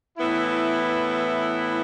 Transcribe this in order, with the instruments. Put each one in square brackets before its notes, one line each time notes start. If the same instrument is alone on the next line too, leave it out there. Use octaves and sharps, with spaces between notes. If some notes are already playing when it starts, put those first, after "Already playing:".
[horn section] A2 E3 B3 E4